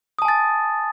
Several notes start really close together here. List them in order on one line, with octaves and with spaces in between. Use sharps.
D#6 A5 G#5 A6